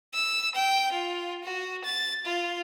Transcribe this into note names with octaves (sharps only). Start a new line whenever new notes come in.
E6
G5
F4
F#4
A6
F4